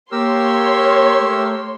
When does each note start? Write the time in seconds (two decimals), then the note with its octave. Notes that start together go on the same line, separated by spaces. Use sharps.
0.12 A#3 G4 A#4 C#5 C6 E6
1.19 A3